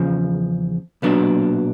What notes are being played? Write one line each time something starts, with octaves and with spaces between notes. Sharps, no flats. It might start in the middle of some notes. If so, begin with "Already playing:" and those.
Already playing: E2 C#3 F3
B1 A#2 F#3 B3 D4